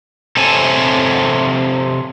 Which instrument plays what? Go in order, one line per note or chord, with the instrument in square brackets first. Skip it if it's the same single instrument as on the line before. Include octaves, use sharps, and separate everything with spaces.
[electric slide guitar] C3 C4 A4 C#5 G#5 A5